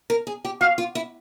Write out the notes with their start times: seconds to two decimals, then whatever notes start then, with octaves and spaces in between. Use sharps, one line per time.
0.10 A#4
0.27 G#4
0.45 G4
0.61 F#4 F5
0.78 F4
0.95 E4